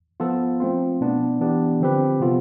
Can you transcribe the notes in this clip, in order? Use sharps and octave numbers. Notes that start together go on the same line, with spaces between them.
F3 B3 F4 A4
F3 A3 C4 F4
B2 B3 D4
E3 B3 D4 G4
D3 F3 C4 G4 B4
C3 F3 B3 F4 A4